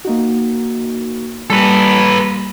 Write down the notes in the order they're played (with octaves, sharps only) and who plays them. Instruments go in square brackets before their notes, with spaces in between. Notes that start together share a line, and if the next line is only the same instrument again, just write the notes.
[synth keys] A#3 D#4 F#4
[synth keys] G3 A#3 [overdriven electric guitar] A4 B4